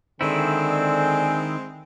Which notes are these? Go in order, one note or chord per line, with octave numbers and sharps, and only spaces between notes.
D3 D#3 G#3 C4 D4 E4 D5 G#5